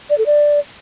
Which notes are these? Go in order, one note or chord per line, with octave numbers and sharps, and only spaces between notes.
D5
A4
D5